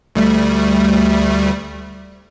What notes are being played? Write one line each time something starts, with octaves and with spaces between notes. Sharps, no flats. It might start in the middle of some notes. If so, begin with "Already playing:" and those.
D2 G3 A3